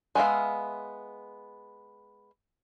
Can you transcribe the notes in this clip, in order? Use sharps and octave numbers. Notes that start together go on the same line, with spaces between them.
G#3 B3 E5 F5